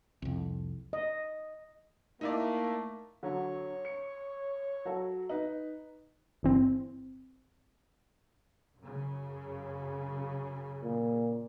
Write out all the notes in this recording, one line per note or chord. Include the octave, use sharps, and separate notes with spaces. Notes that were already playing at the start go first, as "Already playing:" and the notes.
C2 F2
D#5
A3 A#3 D#4 E4 D5
D3 F#3 C#5
C#7
F#3 F#4 A4
D#4 B4
G1 E3 C4
F#2 C#3
A#2